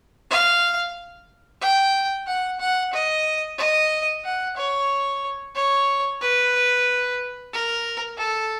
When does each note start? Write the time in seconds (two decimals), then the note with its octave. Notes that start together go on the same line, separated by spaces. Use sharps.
0.31 F5
1.61 G5
2.27 F#5
2.60 F#5
2.93 D#5
3.58 D#5
4.25 F#5
4.57 C#5
5.56 C#5
6.22 B4
7.53 A#4
8.18 A4